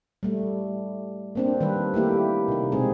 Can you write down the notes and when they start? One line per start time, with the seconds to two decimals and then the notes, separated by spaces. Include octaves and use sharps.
0.23 G3 A3
1.35 A#3 C4 D4
1.61 D#3 G3 B4
1.94 A3 A#3 E4 G4
2.48 C3 D#4
2.72 B2 G#3 C4 G#4